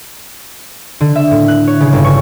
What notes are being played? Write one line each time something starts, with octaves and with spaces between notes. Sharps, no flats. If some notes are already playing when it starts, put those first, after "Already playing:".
D3
E5
A2
F#6
C#5
C#3
G1
C#6